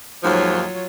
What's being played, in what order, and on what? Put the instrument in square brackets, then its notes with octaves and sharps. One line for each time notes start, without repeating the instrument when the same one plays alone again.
[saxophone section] D#2 G#2 F3 [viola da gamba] F#3 F4 C#5